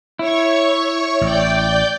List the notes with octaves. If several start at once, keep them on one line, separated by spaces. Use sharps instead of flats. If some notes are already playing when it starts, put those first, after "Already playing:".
E4 C#5 C#6
A1 D5 G5 G6